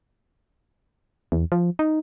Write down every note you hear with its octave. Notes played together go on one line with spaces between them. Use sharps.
E2
F3
D#4